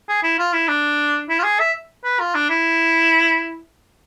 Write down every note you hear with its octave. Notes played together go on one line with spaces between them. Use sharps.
G#4
E4
F4
E4
D4
E4
F4
G#4
E5
B4
F4
D4
E4